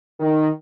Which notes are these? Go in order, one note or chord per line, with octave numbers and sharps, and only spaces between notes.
D#3